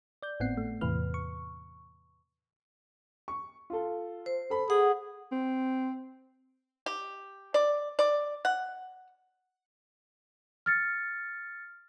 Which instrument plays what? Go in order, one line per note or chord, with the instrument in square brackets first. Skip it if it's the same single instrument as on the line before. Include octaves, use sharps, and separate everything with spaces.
[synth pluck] D5 G6
G#1 A2 B3 C4 F#5 C7
A3
E2 A2 C3 E3 B4 F6
C#6
[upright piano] C#6
F4 A4
[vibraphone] C5
[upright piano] A4 B5
[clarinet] G#4 [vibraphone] F#5
[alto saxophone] C4
[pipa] G4
D5
D5
F#5
[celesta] F6 A6 C#7